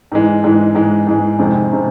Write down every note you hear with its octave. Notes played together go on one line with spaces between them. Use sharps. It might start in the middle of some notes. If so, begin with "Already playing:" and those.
G#2 E3 G#3
G#2 E3 G#3
G#2 E3 G#3
G#2 E3 G#3
F2 C3 D#3 G#3 C4
C3 D#3 G#3 C4